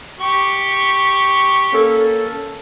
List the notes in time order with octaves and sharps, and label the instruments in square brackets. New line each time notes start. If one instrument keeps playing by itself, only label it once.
[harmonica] G4 C#6
[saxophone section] A#3 C#4 A4